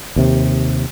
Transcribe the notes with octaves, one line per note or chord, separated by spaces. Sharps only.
D#2 C3